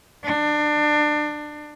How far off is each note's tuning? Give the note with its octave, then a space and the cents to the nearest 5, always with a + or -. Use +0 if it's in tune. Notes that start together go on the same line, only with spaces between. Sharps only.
D4 +25